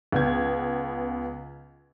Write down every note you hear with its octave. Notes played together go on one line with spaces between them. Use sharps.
C#2 B3 G#6